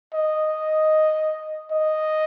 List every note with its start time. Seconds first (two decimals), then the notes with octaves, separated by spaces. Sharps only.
0.14 D#5
1.71 D#5